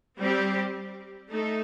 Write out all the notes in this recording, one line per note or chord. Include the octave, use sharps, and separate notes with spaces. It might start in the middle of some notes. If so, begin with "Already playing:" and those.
G3 C4 G4
A3 D#4 A4